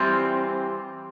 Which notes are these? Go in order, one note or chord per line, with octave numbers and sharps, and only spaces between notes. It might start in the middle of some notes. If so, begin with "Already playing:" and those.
Already playing: E3 G3 C4 F4